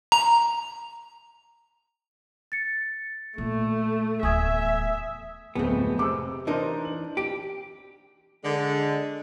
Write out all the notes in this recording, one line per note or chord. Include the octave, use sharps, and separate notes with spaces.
A#5
A6 C#7
A#2 A3
D1 E2 E5 G#5 D#6 G#6
D1 F2 G#3 A3 B3 C4
C3 D6 E6
E3 D4 D#4 A#4 C5
F#7
G4 D7
D3 G#3